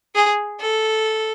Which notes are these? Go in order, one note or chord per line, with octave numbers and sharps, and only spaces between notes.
G#4
A4